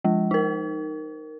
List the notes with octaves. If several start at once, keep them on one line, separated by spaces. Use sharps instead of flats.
F3 G#3
D#4 A#4